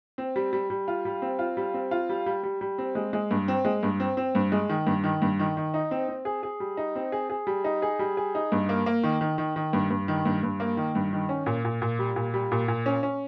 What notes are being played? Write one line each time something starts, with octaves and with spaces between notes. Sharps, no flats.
C4
G3
G3
G3
F4
G3
C4
F4
G3
C4
F4
G3
G3
G3
G3
C4
G#3
G#3
G2
C4
G#3
G2
C4
C4
G2
G#3
D#3
G2
D#3
G2
D#3
D#3
D#4
C4
C4
G#4
G#4
G3
D#4
C4
G#4
G#4
G3
D#4
G#4
G3
G#4
D#4
G2
A#3
A#3
D#3
D#3
D#3
D#3
G2
G2
D#3
G2
G2
A#3
D#3
G2
D#3
C#4
A#2
A#2
A#2
G3
A#2
G3
A#2
A#2
C#4
C#4